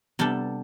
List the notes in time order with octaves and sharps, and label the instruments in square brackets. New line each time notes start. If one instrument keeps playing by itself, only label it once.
[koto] C3 G3 D4 A4 [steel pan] B3